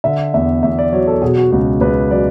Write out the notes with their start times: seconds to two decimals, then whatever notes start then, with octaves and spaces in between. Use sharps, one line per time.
0.04 D3 E5
0.34 E2 E5
0.63 E2 E5
0.79 D5
0.92 F#3 C#5
1.07 A4
1.22 B2 G#4
1.37 F#4
1.51 C#2 F#4
1.81 C#2 B4
2.11 F#3 D5